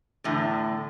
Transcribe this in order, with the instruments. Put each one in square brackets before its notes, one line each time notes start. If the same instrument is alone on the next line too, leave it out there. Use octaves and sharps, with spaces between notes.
[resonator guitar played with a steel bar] E2 A2 D3